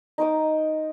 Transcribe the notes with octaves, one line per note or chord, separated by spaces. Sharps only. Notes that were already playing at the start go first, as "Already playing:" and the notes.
D#4 C5 D6 D#6